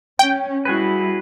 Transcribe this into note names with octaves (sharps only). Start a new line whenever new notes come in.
C#4 G5
G3 E4 F#4 G#4 B4